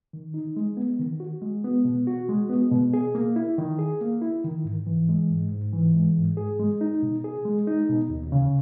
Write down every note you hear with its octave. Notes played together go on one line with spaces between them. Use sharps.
D#3
D#4
G#3
B3
D#3
F#4
G#3
B3
B2
F#4
G#3
B3
B2
G#4
A#3
E4
D#3
G#4
A#3
E4
D#3
G#2
E3
G#3
G#2
G#2
E3
G#3
G#2
G#4
G#3
D#4
B2
G#4
G#3
D#4
B2
D#2
C#3